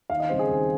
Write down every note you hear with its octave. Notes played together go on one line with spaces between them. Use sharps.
D#2 F5
D#5
C#3 G3 C4 C5
G#4
D#2